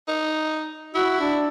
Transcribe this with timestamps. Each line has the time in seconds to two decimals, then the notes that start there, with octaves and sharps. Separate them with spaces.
0.08 D#4
0.95 E4 F#4
1.20 D4